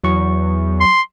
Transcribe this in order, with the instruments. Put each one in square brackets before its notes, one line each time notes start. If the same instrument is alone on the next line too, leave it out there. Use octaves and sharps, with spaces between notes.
[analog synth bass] E2 [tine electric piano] F#3 C#6
[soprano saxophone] C6